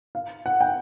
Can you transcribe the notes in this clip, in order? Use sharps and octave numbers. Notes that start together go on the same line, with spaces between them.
F5
F#5
G5